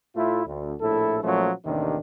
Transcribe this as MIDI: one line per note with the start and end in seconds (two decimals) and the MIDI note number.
0.16 0.42 45
0.16 0.42 57
0.16 0.42 64
0.16 0.42 65
0.46 0.73 38
0.81 1.19 34
0.81 1.19 45
0.81 1.19 64
0.81 1.19 69
1.23 1.50 46
1.23 1.50 53
1.23 1.50 54
1.23 1.50 57
1.23 1.50 61
1.66 1.98 33
1.66 1.98 39
1.66 1.98 48
1.66 1.98 51
1.66 1.98 62